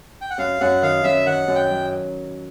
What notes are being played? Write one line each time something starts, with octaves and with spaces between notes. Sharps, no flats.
G5
F#5
F#2 F5
F#2 F#5
D#3 F5
F#2 E5
D#3 F#5
F#2
G5
F#3